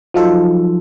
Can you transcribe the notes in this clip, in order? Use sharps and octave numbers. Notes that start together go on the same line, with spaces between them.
F3 F#3 D#4 F4 A4